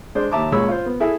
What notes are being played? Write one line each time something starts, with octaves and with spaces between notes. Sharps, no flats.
G#3 D4 C5
D#2 E5 A5 A#5 D6
C#2 A#2 G#3 C#5 B5 E6
F4 C5
B3
E4 G#4 A4 E5